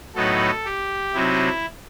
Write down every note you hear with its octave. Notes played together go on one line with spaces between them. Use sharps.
A2 F#3 B3 D#4 A4
G4
C3 F#3 C4 D#4 E4